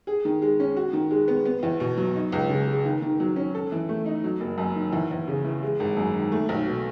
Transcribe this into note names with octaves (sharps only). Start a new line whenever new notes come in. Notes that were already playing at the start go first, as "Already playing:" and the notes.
G#4
D#3
G#3
C#4
F#4
D#3
G#3
B3
B3
E2
B2
F#3
D#4
C#2
C#3
G#3
D#3
D#3
F#3
C#4
A4
E3
A3
D#4
F#3
F#1
F#2
D#3
E2
E2
C#3
E3
G#3
G#1
F#2
D#3
A3
B1
B2